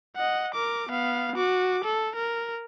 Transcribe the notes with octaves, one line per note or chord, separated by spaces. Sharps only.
D#5 F#5
A#4 D6
B3 F5
F#4 D6
A4
A#4